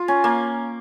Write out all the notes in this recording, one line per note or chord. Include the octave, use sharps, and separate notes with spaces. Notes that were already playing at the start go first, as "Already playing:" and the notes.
Already playing: F4
C#4
A#3